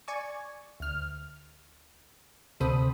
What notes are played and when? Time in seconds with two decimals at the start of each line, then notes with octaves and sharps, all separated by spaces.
0.08 D5 G#5 C#6
0.80 D2 F6
2.60 D2 C3 A4 C5 B5 D#6